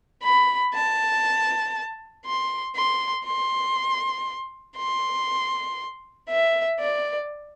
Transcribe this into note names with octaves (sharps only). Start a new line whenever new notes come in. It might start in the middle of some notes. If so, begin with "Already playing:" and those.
B5
A5
C6
C6
C6
C6
E5
D5